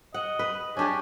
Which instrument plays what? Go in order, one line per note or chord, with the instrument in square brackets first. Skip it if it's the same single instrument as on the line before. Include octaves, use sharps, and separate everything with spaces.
[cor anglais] D#5 [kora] F#5
[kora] B4
[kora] C#4 D4 G#4 [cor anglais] G4